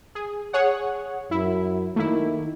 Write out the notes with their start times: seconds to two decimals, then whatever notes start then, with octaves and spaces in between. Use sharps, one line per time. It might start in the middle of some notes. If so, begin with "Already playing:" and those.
0.15 G#4
0.53 G#4 C#5 F#5
1.31 F#2 E4
1.96 D#3 A3 A#3 E4